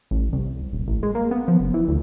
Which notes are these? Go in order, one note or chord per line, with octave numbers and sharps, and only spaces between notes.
A1
C2
D#1
A1
G#3
A#3
B3
F3
F#1
E3
D2